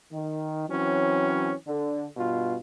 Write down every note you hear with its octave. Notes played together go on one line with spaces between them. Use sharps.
D#3
E3 F#3 C4 C#4
D3
G2 B2 F4